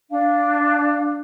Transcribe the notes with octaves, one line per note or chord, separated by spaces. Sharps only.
D4 F5